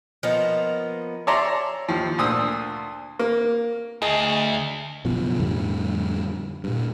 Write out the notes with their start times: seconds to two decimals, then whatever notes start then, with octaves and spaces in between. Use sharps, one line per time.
0.23 F3 A#3 B3 D#4
1.27 C#5 D5 E5 A5 A#5 C6
1.88 D#2 F3
2.18 D2 A#2 C5 D#6 E6
3.19 A#3
4.02 D2 G#4 D#5
5.05 F#1 B1 B2 F3
5.39 F2 A2 D3 G3
6.64 G2 A#2